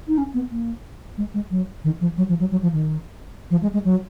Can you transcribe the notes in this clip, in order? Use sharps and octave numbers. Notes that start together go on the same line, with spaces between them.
D#4
C#4
B3
A#3
G#3
G#3
F#3
D#3
F3
F#3
F3
F#3
F#3
F3
D#3
F3
G#3
G#3
F#3